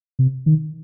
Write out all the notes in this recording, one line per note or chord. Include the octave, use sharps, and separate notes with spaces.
C3
D#3